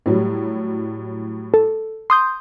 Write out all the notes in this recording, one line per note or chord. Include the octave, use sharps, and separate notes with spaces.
A2 F#3 G3
A4
C6 D#6 G6